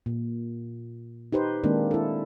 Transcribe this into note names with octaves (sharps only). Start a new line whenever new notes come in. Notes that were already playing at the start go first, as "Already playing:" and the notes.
A#2
D#4 G4 B4 C5
D#3 G#3 A#3 C4 D4
E4 A4